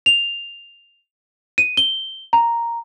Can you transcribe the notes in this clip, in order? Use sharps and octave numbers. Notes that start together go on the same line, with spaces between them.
F7
D#7
G7
A#5